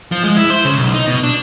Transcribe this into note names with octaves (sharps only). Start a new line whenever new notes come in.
F3
G#3
E4
C5
C#3
B1
D#4
B2
D4